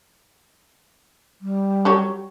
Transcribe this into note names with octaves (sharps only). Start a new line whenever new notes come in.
G3
F#3 G4 C#5